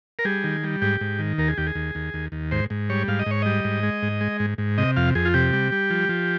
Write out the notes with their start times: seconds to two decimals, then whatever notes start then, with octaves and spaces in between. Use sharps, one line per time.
0.19 A#4
0.25 G3 G#4
0.44 D#3
0.64 G3
0.82 G#2 G4
1.01 G#2
1.19 D#3
1.38 D#2 A#4
1.48 G#4
1.57 D#2 G4
1.67 G#4
1.75 D#2
1.95 D#2
2.14 D#2
2.32 D#2
2.51 G#2 C5
2.70 G#2
2.90 G3 C#5
3.08 G#2 F5
3.19 D#5
3.26 G#2 C#5
3.42 G3 D#5
3.64 G#2
3.83 G#3
4.03 G#2
4.21 G#3
4.40 G#2
4.58 G#2
4.78 C3 D#5
4.97 F2 F5
5.15 F2 G#4
5.25 F4
5.34 C3 G4
5.53 G3
5.72 G3
5.90 F3
6.09 F3